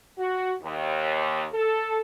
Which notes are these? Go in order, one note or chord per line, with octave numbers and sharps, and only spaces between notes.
F#4
D#2
A4